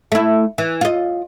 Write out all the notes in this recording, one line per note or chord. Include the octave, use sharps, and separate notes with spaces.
A3 E4
E3
F4 D#5